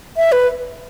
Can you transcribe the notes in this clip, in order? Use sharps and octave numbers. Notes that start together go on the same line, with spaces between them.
E5
B4